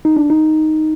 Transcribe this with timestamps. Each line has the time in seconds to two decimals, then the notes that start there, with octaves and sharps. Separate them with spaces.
0.05 D#4
0.17 D4
0.30 D#4